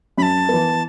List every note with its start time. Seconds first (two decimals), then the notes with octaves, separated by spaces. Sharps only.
0.18 F#2 B5
0.22 A5
0.49 E3 B3